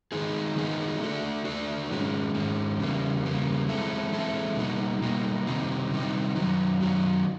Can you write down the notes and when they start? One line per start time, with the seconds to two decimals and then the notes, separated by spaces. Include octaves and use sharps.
0.12 D#3 G#3 B3 D#4 G#4
0.56 D#3 G#3 B3 D#4 G#4
1.01 A3 D4 F#4 A4 D5
1.45 A3 D4 F#4 A4 D5
1.90 G#2 D#3 G#3 C#4
2.34 G#2 D#3 G#3 C#4
2.79 E2 C#3 G3 A#3
3.24 E2 C#3 G3 A#3
3.68 E3 G#3 C4 E4 A4
4.13 E3 G#3 C4 E4 A4
4.57 B2 G3 A#3 D#4 F#4
5.02 B2 G3 A#3 D#4 F#4
5.46 C3 D#3 G3 C4 D#4
5.91 C3 D#3 G3 C4 D#4
6.36 F#2 D#3 F#3
6.80 F#2 D#3 F#3